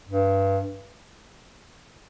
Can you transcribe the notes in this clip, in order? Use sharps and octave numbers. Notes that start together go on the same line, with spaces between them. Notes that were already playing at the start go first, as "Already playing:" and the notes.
G2